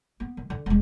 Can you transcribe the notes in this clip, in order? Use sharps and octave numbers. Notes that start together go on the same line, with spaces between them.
B3
D#3
D3
E1 G#3